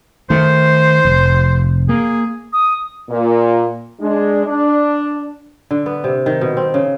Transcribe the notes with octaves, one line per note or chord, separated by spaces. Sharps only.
D#3 A3 C5
F1
A#3 G#4
D#6
A#2
G#3 D4
D4
D3
B3
C3
D#3
B2
C4
C#3